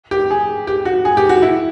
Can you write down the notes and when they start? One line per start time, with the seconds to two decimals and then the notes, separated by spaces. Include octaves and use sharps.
0.11 G4
0.31 G#4
0.67 G4
0.85 F#4
1.05 G#4
1.17 G4
1.29 F#4
1.42 E4